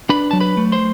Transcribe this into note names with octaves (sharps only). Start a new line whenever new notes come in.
D4 B4 B5
F#3 A5
B4 B5
A3
C5 C6